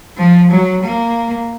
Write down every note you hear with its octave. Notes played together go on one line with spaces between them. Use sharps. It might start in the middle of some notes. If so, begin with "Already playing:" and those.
F3
F#3
A#3